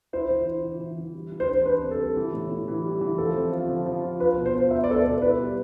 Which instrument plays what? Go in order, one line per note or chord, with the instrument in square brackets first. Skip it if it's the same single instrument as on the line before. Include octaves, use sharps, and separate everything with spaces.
[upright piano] E4 [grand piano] C5
[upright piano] E3
E4
E3
E3
E3
G3
E3
[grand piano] C5
[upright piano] D4
[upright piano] D4 [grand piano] B4
[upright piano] C3
[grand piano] A4
[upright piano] G3
E3
A2
E3
E3
G3
E3
[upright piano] F3 [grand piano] A4
[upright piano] C4
F4
F3
F3
F4
[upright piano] F4 [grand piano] B4
[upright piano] B2
[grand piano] C5
[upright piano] F4
[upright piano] B3 [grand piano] E5
[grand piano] D5
[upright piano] B3 [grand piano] A4
[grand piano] B4
[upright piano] B2 [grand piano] D5
[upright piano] E4 [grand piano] B4
[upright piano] G3